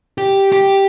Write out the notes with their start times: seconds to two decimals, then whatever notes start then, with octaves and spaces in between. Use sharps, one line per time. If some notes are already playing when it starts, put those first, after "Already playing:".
0.18 G4
0.52 G4